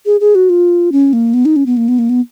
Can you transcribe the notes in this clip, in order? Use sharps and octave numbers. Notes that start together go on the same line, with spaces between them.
G#4
G#4
F#4
F4
C#4
A#3
B3
D#4
C#4
B3
A#3
B3
A#3
B3